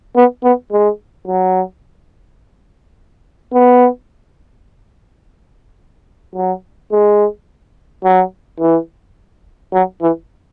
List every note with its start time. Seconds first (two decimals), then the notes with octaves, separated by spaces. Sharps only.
0.16 B3
0.43 B3
0.72 G#3
1.28 F#3
3.53 B3
6.35 F#3
6.92 G#3
8.04 F#3
8.60 E3
9.74 F#3
10.02 E3